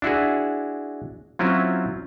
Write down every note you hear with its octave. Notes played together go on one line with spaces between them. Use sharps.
D4 E4 F#4 G#4
F#3 C4 C#4 E4 F4